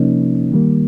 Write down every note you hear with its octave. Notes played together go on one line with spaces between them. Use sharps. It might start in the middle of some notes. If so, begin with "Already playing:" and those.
Already playing: C3 F3 A#3 C#4 D#4
D#3 G3 A#3